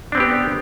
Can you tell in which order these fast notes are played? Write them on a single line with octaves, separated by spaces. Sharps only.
D4 C4 B3 G4